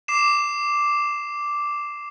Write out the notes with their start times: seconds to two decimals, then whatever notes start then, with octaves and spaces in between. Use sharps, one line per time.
0.08 D6 C7 E7